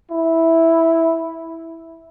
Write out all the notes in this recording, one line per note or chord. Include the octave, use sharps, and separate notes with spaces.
E4